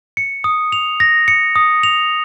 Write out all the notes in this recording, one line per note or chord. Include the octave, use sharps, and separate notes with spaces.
C#7
D#6
F7
A#6
C#7
D#6
F7